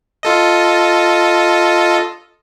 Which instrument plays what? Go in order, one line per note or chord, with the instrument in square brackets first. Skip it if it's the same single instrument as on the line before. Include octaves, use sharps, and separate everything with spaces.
[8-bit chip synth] F4 A4 D#5